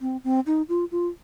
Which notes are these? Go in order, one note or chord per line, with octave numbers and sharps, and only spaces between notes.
C4
C4
D#4
F4
F4